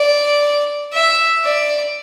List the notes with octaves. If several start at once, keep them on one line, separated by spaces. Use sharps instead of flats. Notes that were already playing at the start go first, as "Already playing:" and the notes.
Already playing: D5
E5
D5